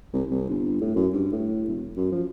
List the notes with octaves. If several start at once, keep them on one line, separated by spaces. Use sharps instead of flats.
C2
C2
G1
A2
F#2
G2
A2
E1
F#2
F3